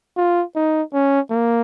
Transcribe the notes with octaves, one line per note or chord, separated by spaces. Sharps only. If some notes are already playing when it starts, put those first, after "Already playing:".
F4
D#4
C#4
A#3